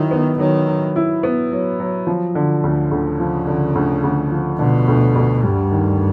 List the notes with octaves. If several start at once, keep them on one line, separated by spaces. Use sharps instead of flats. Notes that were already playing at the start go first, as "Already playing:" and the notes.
Already playing: D#3 F#3 E4
B3
D#3 F#3
F#3
E4
B3
F#3
F#3
F3
D3
D2
D2 C#3
F3
D3
D2
D2
F3
B2 D3
D2
D2
G2 G3
D#3